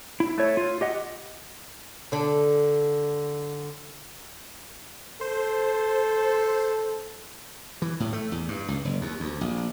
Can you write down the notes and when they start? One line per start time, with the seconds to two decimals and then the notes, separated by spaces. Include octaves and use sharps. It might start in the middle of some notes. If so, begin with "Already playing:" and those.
0.20 E4
0.38 A3 C#5
0.57 F4
0.81 G4 D#5 F#5
2.12 D3 D4
5.21 A4 C5
7.82 E3
8.00 A2
8.13 A3
8.32 E2
8.48 G2
8.68 C#2
8.85 F#1
9.01 D#2
9.20 D2
9.41 A#1